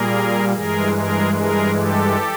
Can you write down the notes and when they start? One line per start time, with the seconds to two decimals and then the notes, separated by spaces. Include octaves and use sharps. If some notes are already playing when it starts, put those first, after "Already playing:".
Already playing: A#2 G3 A#3 G#4 A#4
0.53 G2 E3 G#3 G#4 A#4
0.94 G#4 A#4
1.34 G#4 A#4
1.75 G4 A4